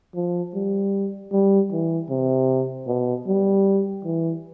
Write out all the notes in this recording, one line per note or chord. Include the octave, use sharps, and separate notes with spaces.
F3
G3
G3
E3
C3
B2
G3
E3